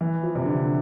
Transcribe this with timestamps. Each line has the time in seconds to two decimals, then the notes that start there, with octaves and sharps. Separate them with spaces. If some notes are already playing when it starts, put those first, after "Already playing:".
0.01 E3
0.23 F3
0.35 C3
0.45 D3